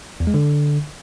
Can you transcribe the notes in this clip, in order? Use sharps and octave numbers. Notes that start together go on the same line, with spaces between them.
E2
G#3
D3